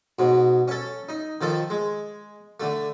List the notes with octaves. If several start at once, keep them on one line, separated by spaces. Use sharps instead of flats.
G#2 B2
C#4 A4
D#4
D#3 F3 A4
G#3
D3 A3